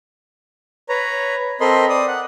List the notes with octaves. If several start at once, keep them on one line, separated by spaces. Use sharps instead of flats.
B4 C#5 A#5
C4 A4 A#4 D#5 B5 C6
D5 D#6
F#5